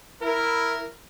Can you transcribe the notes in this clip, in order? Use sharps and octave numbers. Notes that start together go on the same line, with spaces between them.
E4 A#4